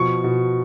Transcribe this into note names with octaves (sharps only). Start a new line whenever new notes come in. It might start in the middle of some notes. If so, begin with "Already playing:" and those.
Already playing: B2 F3 C#6
B2